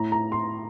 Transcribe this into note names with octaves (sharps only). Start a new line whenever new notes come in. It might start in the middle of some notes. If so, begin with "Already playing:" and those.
Already playing: A2 A#5
A#5
C6